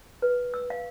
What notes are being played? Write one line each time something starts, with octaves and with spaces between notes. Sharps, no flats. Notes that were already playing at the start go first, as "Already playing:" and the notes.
B4
E6
F5